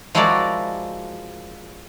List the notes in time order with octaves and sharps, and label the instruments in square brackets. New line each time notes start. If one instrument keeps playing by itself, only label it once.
[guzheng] F3 G#3 E4 F#4 A#4 D5